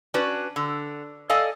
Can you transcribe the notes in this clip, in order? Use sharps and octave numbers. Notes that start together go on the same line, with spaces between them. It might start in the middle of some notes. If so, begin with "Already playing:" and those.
C#4 D4 F#4 B4 D5
D3
A4 D5 D#5 F5 G#5